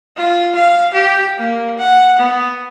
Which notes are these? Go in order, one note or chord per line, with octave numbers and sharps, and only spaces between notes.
F4
F5
G4
A#3
F#5
B3